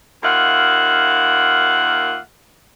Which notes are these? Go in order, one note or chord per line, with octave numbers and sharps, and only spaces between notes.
D#2 A#3 F4 E5 F#5